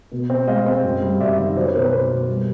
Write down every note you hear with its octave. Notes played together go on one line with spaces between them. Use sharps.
B2
C4
G#3 D#5 F5
C4
F#2
G3
F#2 D5 E5
D#3
F#3 C5 D5
B4 C#5
B2 A#4 C5
B4
B3 A#4 C5
B2
G3